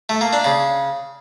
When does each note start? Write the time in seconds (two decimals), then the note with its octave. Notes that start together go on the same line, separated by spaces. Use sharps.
0.09 A3
0.21 A#3
0.33 D4
0.44 C#3